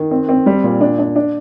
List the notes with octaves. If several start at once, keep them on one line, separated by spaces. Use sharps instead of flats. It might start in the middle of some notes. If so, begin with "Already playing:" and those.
Already playing: D#3
C4
C4
G3
A#2
D4
D4
D4